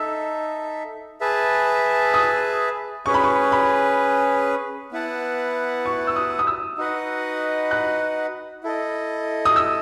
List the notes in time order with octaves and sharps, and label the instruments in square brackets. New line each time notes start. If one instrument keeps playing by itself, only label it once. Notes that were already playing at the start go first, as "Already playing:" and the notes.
Already playing: [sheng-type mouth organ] D#4 A4 E5 [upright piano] E6
[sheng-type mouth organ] G#4 B4 E5 A5
[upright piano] D#6
[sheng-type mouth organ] C#4 G#4 B4 [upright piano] C#6
[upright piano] B5
C#6
B5
[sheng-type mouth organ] B3 E4 B4 F#5 A5
[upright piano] C#6
E6
D#6
D#6
E6
[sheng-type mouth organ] D#4 F#4 B4 D#5 F#5
[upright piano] F#6
[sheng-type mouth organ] E4 A4 D#5
[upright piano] D#6
E6